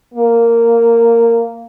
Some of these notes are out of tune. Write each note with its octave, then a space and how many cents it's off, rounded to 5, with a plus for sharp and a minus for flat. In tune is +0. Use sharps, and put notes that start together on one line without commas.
A#3 -10